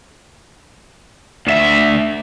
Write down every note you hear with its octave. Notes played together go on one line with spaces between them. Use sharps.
D2 E5